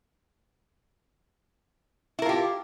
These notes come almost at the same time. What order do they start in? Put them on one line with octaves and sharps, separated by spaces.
E4 A#4 F4 G4